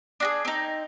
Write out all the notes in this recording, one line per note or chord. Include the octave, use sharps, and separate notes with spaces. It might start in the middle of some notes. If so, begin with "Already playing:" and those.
D4 F#4 G#4
C4 D#4